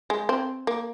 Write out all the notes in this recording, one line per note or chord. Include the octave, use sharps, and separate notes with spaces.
G#3
C4
A#3